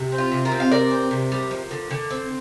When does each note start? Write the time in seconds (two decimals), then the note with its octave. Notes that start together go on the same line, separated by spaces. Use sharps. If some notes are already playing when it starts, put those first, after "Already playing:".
Already playing: C3
0.12 C4
0.18 F4
0.32 C3
0.45 F4 A#4
0.52 C4
0.60 F5
0.71 C3 A#4 D5
0.91 C4
1.11 C3
1.32 G3
1.51 F3
1.71 D3
1.91 D3
2.11 C4